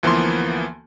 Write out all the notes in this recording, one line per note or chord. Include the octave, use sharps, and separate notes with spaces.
D2 E3 F3 A#3 B3 C6